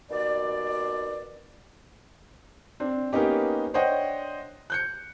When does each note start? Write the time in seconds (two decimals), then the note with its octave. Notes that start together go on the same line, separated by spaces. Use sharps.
0.10 D#2 B2 D5
2.80 C4 D4
3.13 A#3 B3 C#4 D#4 G4
3.74 D4 C5 C#5 D#5 F#5 G5
4.70 F#6 G6 C#7